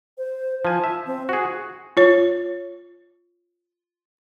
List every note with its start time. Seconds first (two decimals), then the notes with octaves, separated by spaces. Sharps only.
0.18 C5
0.65 F3 G#5 A5
0.84 E5
1.06 C4
1.29 F#4 G#4 F#5
1.97 F4 C#5